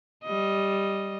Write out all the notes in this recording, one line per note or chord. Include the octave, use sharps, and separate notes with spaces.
G3 D#5